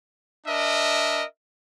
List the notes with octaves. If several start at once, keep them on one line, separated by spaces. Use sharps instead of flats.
D4 A#4 D#5 E5